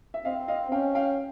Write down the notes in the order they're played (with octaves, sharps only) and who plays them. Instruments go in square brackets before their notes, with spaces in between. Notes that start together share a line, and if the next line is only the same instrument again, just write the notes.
[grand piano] E5
[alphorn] C4 [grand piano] D#5 F5
[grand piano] D#5 F5
[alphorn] C#4 [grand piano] F5 G5
[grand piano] F5 G5